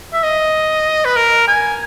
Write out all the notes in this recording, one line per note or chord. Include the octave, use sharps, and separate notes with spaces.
E5
D#5
B4
A#4
G#5